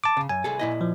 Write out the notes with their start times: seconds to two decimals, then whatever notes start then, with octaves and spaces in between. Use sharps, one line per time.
0.04 A5 D6
0.17 C#3
0.29 F#2 G#5
0.44 C2 G#4 A4
0.59 A#2 E4 D#5
0.81 F3